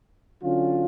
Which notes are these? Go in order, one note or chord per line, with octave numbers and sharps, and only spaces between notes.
D3 F#3 C#4 F4